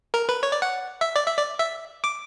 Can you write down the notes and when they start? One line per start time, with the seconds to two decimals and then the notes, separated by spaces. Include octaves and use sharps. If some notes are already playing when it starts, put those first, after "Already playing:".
0.14 A#4
0.29 B4
0.43 C#5
0.52 D5
0.62 F#5
1.01 E5
1.16 D5
1.26 E5
1.37 D5
1.59 E5
2.04 D6